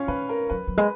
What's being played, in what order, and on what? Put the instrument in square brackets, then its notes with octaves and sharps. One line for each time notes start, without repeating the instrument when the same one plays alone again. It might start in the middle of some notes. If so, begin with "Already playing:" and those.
Already playing: [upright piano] C#4 F4 C#5
[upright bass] D#3 [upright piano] B4
[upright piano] A#4
[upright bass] F#3 [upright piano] B4
[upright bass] F#3
[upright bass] G#3 [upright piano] B4